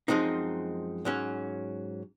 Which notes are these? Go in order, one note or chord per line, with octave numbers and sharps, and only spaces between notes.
F#2 F3 G#3 C4 D#4
G#2 F#3 C#4